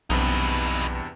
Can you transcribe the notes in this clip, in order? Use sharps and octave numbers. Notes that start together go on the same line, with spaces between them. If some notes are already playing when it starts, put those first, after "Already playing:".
B1 E2 G2 C3 D#4 B4